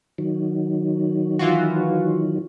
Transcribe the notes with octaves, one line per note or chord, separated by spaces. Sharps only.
D#3 F#3
E3 F4 F#4